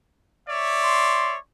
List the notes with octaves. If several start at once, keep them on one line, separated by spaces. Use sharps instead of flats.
C#5 D5 E5
C6